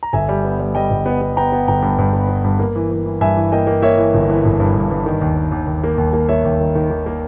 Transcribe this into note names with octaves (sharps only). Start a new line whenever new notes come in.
A#5
G1 E5 G#5
G3
B3
G3
G3 D#5 G5
G1
B3
B3
B3 G5 A#5
B3
G1 G5 A#5
G2
G2
B3
B3
G2
A#3
E3
E3
E3
G2 E5 G#5
E3
A#3 D#5 G5
A#3
A#3 C#5 E5
E3
G1
E3
G1
G2
G2
G2
D#3
D#2
D#2
D#2
D#2
A#3
D#2
A#3
A#3 C#5 E5
D#2
D#3
D#3
D#3
A#3